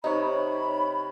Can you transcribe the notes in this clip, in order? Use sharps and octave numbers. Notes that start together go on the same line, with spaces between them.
C3 D#4 B4 C#5 B5